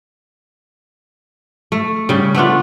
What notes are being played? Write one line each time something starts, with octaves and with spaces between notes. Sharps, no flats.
A3
C#3 G3
A3 B3 D4 F4